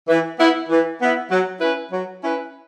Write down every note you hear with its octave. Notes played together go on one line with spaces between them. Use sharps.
E3
B3 E4
E3
B3 E4
F#3
C#4 E4 B4
F#3
C#4 E4 B4